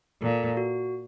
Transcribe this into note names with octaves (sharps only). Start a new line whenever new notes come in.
A#2 A4
F#4